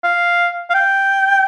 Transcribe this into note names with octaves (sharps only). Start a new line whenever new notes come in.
F5
F5
G5